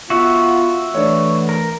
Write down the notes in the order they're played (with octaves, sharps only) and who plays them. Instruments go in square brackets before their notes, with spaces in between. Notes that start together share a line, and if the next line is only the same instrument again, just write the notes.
[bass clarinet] B3 [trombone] F4 [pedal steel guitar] F#4 E5 F#5
[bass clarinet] E3 [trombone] A3 [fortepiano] D4 C#5
[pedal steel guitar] A#4